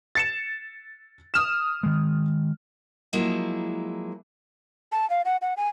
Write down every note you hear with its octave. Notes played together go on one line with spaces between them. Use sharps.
A6 C#7 E7
D#6 F6 E7
D#3 G#3
F3 F#3 G#3 A#3 E4
A5
F5
F#5
F#5
G#5